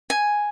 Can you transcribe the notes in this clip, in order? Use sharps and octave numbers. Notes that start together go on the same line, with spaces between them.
G#5